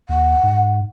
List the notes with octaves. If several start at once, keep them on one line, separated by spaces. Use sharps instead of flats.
D#2 F#5
G#2